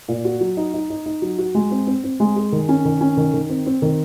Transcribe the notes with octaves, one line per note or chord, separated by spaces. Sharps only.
A#2
F#4
F#3
D#4
D#4
D#4
D#4
F#3
F#4
G#3
C4
C4
C4
G#3
G#4
D#3
C#4
D#3
C#4
D#3
D#3
C4
C4
D#3